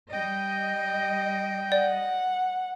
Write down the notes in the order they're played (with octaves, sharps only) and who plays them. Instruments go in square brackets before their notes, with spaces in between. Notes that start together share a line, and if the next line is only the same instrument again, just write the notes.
[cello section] G3 D#5 [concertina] G5
[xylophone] D5 [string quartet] F#5